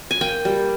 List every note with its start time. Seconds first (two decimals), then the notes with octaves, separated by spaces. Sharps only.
0.11 G#5
0.21 A#3 G5
0.45 G3